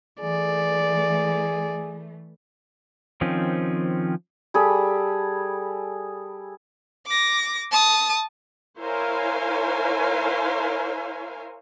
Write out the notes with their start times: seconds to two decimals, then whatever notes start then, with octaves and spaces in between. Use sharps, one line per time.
0.20 E3 A3 G#4 D5
3.21 D#3 F3 C4 C#4
4.54 G3 G#4 A4 B5
7.06 D6 A#6
7.71 A5 D#6
8.80 E4 A#4 C5 C#5 F5 G#5